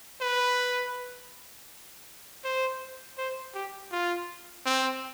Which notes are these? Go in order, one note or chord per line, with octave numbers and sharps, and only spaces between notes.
B4
C5
C5
G4
F4
C4